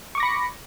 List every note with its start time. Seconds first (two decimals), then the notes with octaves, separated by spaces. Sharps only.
0.15 C#6
0.18 D6
0.20 A#6
0.23 B5
0.25 C#7